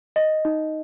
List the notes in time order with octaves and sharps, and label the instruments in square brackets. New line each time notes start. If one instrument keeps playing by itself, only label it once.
[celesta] D#5
D#4